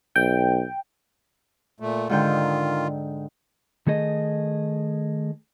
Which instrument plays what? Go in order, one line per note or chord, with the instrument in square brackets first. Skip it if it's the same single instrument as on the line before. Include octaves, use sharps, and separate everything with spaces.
[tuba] B1 [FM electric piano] G5
[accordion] A#2 A3
[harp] G#2 D3 G5 [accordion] D#3 F4
[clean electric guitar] D#3 A3 G#4 D#5